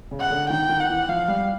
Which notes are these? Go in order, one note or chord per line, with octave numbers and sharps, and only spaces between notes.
C#3
F#5
D3
D#3 G5
D#3
F#5
E3
F3 F5
G3